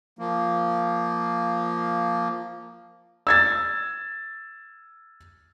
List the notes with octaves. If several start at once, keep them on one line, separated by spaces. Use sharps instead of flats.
F3 A#3
E6 G#6 A6